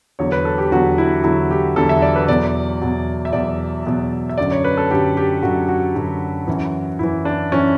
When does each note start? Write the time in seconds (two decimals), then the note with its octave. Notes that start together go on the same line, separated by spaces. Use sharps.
0.19 E2 D3 F#3 C#5
0.32 B4
0.45 A4
0.58 G4
0.71 E2 D3 F#3 F#4
0.98 E4
1.24 E2 D3 F#3 E4
1.51 G4
1.76 E2 D3 F#3 A4
1.89 E5
2.02 D5
2.16 B4
2.28 E2 B2 F#3 D5
2.82 E2 B2 F#3
3.25 E5
3.33 E2 B2 F#3 D5
3.86 E2 B2 F#3
4.29 E5
4.38 F#2 D3 F#3 D5
4.51 C#5
4.64 B4
4.77 A4
4.90 F#2 D3 F#3 G4
5.17 G4
5.43 F#2 D3 F#3 F#4
5.69 F#4
5.95 F#2 D3 F#3
6.47 F#2 E3
6.99 F#2 E3 E4
7.25 D4
7.52 F#2 E3 C#4